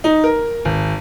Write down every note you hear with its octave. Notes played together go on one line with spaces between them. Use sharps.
D#4
A#4
G#1